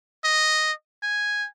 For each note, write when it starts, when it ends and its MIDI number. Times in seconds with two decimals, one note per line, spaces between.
0.24 0.72 75
1.03 1.47 80